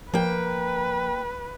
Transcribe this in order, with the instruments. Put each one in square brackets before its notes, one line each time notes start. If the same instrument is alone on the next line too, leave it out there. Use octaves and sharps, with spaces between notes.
[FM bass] F3 [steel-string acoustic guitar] A#3 G5 [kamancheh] B4